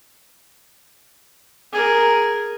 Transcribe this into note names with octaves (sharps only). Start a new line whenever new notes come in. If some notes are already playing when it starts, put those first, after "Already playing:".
G#4 A#4